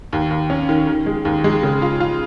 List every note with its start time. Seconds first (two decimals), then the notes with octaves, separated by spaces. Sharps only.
0.13 D#2
0.31 D#2
0.50 C#4
0.69 D#3
0.87 D#3
1.06 G#3
1.25 D#2
1.44 G#3
1.63 C#3
1.82 F4
2.00 F4